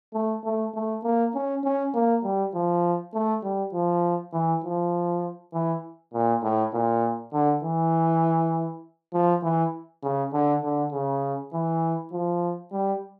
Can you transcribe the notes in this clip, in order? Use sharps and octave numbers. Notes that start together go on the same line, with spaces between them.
A3
A3
A3
A#3
C#4
C#4
A#3
G3
F3
A3
G3
F3
E3
F3
E3
A#2
A2
A#2
D3
E3
F3
E3
C#3
D3
D3
C#3
E3
F3
G3